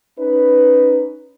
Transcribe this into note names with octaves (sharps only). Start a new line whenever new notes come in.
C#4 D#4 B4